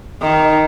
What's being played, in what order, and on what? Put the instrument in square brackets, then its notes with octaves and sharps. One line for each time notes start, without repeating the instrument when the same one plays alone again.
[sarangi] D#3